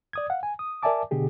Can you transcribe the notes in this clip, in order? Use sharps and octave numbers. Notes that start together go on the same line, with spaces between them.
D5 D#6 G#6
F5 F#5
G#5
D#6
A#4 D5 E5 G#5 A5 D6
B2 D3 G4 G#4